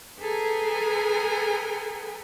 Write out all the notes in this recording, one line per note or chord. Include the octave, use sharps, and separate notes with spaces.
G#4 A4 B4 G5 G#5 A#5